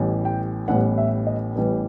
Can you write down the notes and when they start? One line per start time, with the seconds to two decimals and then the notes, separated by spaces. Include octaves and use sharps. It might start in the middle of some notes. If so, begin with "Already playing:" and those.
Already playing: A1 A2 E3 G3 B3
0.25 G5
0.68 A1 A2 E3 G3 B3 F#5
0.98 E5
1.27 D#5
1.56 A1 A2 E3 G3 B3